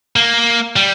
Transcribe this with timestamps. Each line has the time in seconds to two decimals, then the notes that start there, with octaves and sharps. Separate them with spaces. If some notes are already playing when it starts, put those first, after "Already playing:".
0.16 A#3
0.76 G3